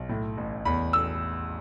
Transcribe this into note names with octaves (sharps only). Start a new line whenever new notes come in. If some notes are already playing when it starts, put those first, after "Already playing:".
Already playing: B1
A2
A1
E2 B5
E6